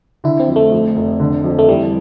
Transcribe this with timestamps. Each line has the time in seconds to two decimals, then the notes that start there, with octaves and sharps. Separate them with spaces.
0.24 D3 E4
0.40 C4
0.48 F2
0.56 A3
0.72 F2
0.96 F1
1.20 D3
1.44 F2
1.59 A3
1.69 E3 G3